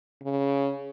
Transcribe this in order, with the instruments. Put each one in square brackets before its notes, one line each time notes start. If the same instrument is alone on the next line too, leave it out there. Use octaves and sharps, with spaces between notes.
[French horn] C#3